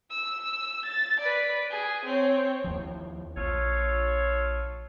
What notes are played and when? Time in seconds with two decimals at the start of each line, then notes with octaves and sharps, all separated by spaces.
0.10 E6
0.85 A6
1.20 B4 D5
1.70 G#4
2.05 C4 C#5
2.64 D#2 F3
3.37 A#1 F4 A4 C#5